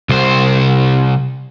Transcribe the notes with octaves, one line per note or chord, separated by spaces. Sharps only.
C2 C5